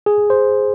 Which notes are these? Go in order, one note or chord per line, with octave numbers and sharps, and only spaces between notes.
G#4
C5